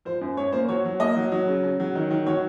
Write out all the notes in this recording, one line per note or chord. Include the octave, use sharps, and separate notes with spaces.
F3 C5
F#2
F#2 C#5
A#3 C5
F#3 C#5
F#3
A#3 D#5
F#3
F#3
C#3
C#3
F#3
D#3
D#3
F#3 C#5